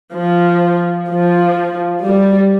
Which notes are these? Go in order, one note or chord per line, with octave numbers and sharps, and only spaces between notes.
F3
F3
G3